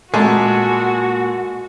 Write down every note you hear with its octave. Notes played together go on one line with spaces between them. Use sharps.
A#2 G#3 A3 F#4 G#5